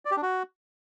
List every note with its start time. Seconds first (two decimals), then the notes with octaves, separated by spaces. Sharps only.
0.05 D5
0.11 G4
0.17 D4
0.23 F#4